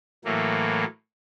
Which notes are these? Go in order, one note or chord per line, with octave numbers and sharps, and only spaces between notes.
A2 E3 F#3 A#3